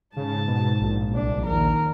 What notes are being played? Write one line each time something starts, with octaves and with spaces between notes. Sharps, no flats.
G#2 C#3 A5
B2
A#1
C2 D4
D#2 A#4